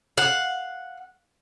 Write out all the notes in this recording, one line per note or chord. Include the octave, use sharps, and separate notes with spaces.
F5 F#5